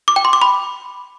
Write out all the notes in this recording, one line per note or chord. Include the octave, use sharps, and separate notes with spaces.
D6
G5
C6
D6
B5